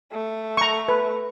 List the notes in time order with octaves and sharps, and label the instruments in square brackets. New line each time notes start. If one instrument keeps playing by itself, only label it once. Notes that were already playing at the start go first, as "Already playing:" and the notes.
[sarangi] A3
[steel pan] A#5 C#6
B4